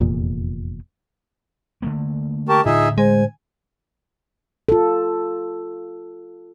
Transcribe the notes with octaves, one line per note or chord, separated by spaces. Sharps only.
F1 E2 A#2
D3 A3 A#3
G4 A#4 A5 C#6
A2 D3 D#4 F4 G#4 E5
G#3 C5 G#5
F4 A4